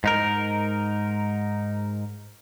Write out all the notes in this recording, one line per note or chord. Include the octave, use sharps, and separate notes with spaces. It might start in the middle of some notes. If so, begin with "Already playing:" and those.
G#2 D#4 A#4